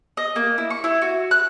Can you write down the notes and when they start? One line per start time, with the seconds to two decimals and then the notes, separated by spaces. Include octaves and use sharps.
0.17 D#5
0.36 A#3
0.58 E4
0.70 C#6
0.84 E4
1.02 F#4
1.31 F#6